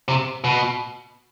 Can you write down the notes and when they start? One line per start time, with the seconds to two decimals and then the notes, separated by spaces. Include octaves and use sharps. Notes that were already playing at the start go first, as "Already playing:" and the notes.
0.08 C3
0.44 B2